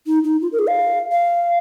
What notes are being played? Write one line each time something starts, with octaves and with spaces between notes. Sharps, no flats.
D#4
D#4
F4
A#4
G#4
F5
F5